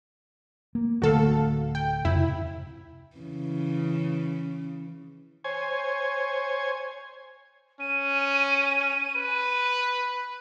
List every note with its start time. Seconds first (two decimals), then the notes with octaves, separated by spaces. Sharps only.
0.75 A#3
1.02 D1 D3 A3 F#4 A4 F5
1.75 G5
2.05 F2 C3 E4
3.17 C#3 E3
5.44 C5 C#5 G#5
7.80 C#4 D#7
9.16 B4